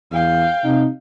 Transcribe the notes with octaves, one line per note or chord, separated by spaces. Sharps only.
E2 F5 G5
C3 D#4